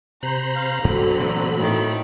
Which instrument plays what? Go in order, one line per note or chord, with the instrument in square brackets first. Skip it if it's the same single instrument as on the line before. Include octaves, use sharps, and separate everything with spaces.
[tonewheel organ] C3 C5 B5 [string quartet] A#5
[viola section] F5
[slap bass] G2 [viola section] D3 F#3 C4 [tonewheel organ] B5
[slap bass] A#2 E3 A3
[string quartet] A2 D#3